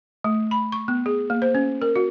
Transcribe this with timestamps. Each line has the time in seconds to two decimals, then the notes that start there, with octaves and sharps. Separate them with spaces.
0.24 A3
0.51 B5
0.72 C#6
0.88 B3
1.06 G#4
1.30 A#3
1.42 C5
1.55 C#4
1.82 A#4
1.96 F#4